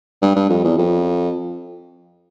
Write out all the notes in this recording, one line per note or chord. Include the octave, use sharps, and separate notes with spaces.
G2
G2
F2
E2
F2